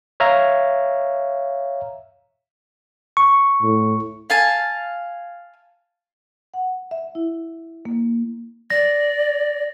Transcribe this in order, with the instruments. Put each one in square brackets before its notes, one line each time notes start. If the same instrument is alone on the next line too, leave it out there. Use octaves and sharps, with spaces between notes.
[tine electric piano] C#5 E5 F5 A#5
C#6
[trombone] A2
[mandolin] F5 G#5 A5
[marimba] F#5
E5
E4
A#3
[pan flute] D5 [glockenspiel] A#6